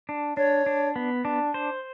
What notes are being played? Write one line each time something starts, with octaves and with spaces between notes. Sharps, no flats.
D4
D4 C#5
D4
B3
D4
C5